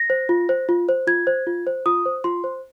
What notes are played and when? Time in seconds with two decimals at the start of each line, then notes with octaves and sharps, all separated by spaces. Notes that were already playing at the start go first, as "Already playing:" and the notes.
Already playing: A#6
0.10 C5
0.29 F4
0.49 C5
0.69 F4
0.89 C5
1.07 F4 G#6
1.27 C5
1.47 F4
1.67 C5
1.86 F4 D#6
2.06 C5
2.24 F4 C6
2.44 C5